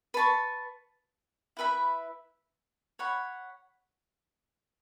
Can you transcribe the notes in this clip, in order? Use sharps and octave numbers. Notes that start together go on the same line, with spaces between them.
B4 A5 C#6
E4 B4 E5 B5
C#5 F#5 B5